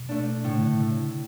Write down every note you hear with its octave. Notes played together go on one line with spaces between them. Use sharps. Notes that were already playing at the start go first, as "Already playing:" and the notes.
Already playing: B2
A3 D4
A2 C#3
D3